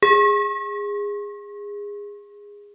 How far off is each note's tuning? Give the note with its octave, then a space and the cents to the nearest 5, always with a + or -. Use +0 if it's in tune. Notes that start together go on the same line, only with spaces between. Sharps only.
G#4 -20